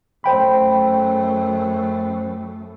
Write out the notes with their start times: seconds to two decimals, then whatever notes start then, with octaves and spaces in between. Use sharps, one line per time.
0.24 F#2 A3 C5 G5 B5